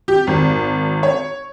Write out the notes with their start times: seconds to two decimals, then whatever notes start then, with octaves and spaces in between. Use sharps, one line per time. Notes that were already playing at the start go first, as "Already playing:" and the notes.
0.08 G4
0.27 G#1
1.03 C#5